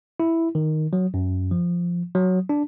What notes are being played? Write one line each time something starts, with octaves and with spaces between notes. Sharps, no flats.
E4
D#3
F#3
F#2
F3
F#3
D4